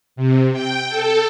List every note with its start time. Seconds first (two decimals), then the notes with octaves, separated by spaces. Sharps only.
0.16 C3
0.52 G5
0.89 A4